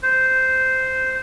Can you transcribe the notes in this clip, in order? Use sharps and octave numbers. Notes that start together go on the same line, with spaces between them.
C5